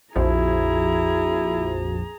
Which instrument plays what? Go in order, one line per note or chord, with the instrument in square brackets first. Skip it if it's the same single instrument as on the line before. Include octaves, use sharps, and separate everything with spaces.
[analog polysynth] A#1 F2 F3 [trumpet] E4 [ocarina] F#4 [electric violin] G#4 A#5